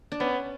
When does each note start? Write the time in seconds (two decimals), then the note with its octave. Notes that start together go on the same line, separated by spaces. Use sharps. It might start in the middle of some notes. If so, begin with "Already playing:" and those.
0.12 D4
0.20 B3 C#4